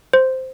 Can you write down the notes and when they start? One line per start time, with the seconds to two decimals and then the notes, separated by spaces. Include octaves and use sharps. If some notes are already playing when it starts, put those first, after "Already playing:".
0.13 C5